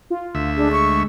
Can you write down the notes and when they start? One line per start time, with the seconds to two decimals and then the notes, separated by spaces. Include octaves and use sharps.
0.10 F4
0.35 D2 E5
0.57 G#3 D4
0.72 C#6